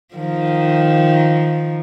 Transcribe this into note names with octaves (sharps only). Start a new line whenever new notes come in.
D#3 F3